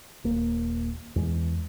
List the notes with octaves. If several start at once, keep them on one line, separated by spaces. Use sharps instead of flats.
D#1 A#3
E2 G#3